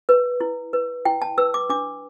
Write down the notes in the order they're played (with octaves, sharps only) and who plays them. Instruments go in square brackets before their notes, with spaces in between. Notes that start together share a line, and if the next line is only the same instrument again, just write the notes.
[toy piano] B4
E4
B4
E4 G5
A5
B4 E6
D6
D4 D6